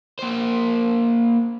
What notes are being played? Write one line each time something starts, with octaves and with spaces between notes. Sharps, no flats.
A#3 C5